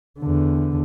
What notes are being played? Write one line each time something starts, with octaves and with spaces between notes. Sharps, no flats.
E2 D3